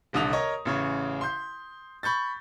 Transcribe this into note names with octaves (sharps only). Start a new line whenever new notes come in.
D#1 C2 D3 D#6 F7
A#4 C#5 D#5 A#5
A1 C#3 C#5
C6 G6
B5 C#6 G6 A6